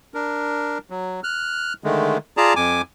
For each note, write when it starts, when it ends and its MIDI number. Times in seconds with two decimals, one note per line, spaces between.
0.14 0.78 62
0.14 0.78 70
0.90 1.20 54
1.24 1.73 89
1.24 1.73 90
1.84 2.18 50
1.84 2.18 51
1.84 2.18 56
1.84 2.18 57
2.37 2.54 65
2.37 2.54 68
2.37 2.54 74
2.37 2.54 81
2.37 2.54 82
2.56 2.82 41
2.56 2.82 80
2.56 2.82 86